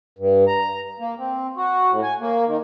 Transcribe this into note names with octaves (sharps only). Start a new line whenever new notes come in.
G2
A#5
A#3
C4
F#4
A2
G#5
A#3
D#3